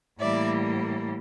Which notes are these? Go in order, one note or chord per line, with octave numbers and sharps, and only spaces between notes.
A2 E3 G3 A#3 D5 E5